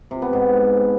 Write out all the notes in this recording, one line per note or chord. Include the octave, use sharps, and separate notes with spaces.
C3
B3
G#2